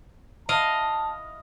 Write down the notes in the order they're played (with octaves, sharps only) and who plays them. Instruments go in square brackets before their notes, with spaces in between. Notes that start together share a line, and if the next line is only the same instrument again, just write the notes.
[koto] E4 D#5 F5 [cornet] A5